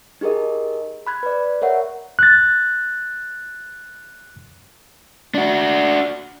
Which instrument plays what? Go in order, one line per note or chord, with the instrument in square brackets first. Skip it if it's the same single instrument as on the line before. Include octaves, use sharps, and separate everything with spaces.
[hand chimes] D#4 G4 G#4 A#4 D#5
B5 F#6 G#6
B4 D5
A#4 C#5 E5 F#5
[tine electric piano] F#6 A6
[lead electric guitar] D4 F#4